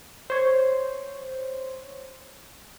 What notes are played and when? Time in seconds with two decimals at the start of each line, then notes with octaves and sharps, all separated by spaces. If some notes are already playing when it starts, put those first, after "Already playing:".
0.30 C5 C#5